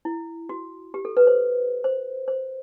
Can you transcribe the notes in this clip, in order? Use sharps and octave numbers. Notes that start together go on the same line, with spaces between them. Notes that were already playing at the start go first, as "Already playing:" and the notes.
E4
F#4
G4
A4
B4
C5
C5
C5